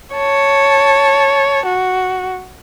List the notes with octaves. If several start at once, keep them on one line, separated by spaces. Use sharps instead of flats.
C#5 A5
F#4